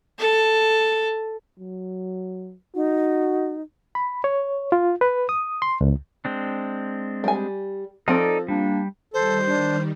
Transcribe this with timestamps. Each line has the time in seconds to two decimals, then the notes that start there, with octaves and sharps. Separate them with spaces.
0.19 A4
1.59 F#3
2.75 D#4 F#4
3.95 B5
4.24 C#5
4.72 F4
5.01 B4
5.29 D#6
5.62 C6
5.81 C#2
6.25 G#3 C4 D4
7.24 G3 G#5
8.08 F3 C4 D#4 A4 D5
8.48 G3 A#3 D4
9.14 D#3 G3 A4 C5
9.47 D4